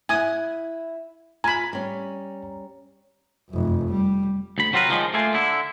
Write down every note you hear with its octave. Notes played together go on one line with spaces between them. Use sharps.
E4 F#5 G#5 D#6
F4 G#5 A#5 B5
G3 C#4
F1 F#2
G3
D2 B5
C3 F#3 C4 F4 A#4 B4
C#2 D#3 F3 G3 G#3
A3 A#3 F4 G#5
D3 E4